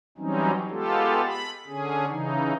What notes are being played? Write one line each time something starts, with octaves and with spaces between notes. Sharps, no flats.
E3 F#3 G3 C4 C#4 D#4
G#3 B3 F4 G4 A4
B5
D3 C#4 G#4
C#3 E3 D#4